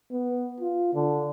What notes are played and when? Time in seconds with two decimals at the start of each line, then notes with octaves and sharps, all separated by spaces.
0.11 B3
0.60 F4
0.94 D3